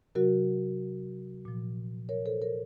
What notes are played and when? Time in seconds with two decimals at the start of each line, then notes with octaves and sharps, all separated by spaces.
0.15 C3 F#3 F#4 A#4
1.45 A#2 F3
2.09 A#4 C#5
2.26 A4 C5
2.41 A#4 C#5